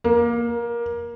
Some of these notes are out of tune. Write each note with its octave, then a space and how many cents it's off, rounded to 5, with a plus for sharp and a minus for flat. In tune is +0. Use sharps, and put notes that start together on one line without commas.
A#3 +20